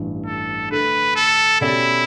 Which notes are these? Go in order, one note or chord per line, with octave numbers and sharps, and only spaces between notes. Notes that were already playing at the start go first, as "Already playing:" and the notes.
Already playing: A1 G2 E3
A4
D3 A3 D4 B4
A4
B2 A3 C#4 E4 G4 D5